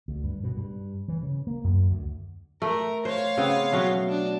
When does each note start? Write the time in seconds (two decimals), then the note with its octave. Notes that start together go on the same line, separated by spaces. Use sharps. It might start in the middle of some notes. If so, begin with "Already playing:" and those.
0.08 D2
0.24 G2
0.44 B2
0.57 G2
1.08 E3
1.23 C#3
1.47 A#3
1.64 F#2
1.91 D2
2.62 A3 A#4
3.05 C5 C#5 F5
3.38 C#3 B3 C4
3.72 B2 F#3 A3
4.09 D4